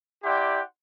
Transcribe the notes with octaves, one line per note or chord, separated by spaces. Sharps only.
E4 G4 D5 F#5 G5 C6